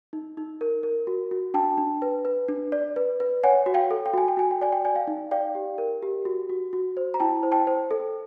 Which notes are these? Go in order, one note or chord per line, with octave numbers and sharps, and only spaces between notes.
D#4
D#4
A#4
A#4
F#4
F#4
D4 G5 A5
D4
B4
B4
D4
D5
B4
B4
C#5 F#5 G#5
F#4
F5 G5
A4
G5
F#4 G#5
G5
F#4 G#5
G5
D5 G#5
G5
D5 G#5
F5 G5
D#4
D5 F5 G5
G4
A#4
G4
F#4
F#4
F#4
C5
A#5
E4 G5 A5
C5
G5 A5
C5
A4